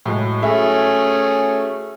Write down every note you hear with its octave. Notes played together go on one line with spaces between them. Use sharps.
A2 F#3 G#3
A3 C#4 E4 F#4 G#4 E5